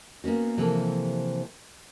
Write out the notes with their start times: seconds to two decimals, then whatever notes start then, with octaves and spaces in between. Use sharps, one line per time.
0.24 A#3 B3 C#4 F#4
0.57 C3 E3 F3 A#3 C4 A4